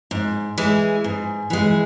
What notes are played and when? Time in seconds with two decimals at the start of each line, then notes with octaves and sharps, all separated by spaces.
0.11 G#2
0.58 E3 G#3
1.04 G#2
1.50 E3 G#3